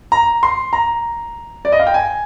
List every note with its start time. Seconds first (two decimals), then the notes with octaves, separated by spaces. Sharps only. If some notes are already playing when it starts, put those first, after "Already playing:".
0.12 A#5
0.43 C6
0.73 A#5
1.65 D5
1.72 D#5
1.79 F5
1.87 G5
1.94 G#5